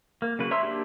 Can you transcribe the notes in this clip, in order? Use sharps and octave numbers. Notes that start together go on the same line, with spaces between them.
A#3
C#3 F#3 A#3 B4
C#5 E5 A#5 C6 E6
A#3 D4 G4